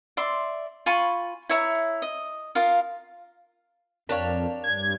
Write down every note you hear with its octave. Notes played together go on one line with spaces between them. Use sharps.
D5 E5 C6
F4 G#5 B5 C#6
E4 C#5 E5 A#5
D#5
F4 A#4 F5
F2 D4 G4 A#4 C#5 D5 F5
G2 G#6